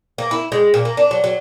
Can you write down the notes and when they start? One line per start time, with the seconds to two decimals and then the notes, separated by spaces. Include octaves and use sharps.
0.18 A#3
0.31 E4
0.52 G#3
0.74 A#2
0.85 A#3
0.97 D4
1.11 F#3
1.24 F#3